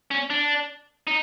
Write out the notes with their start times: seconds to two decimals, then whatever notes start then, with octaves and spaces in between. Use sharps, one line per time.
0.11 C#4
0.30 D4
1.07 D#4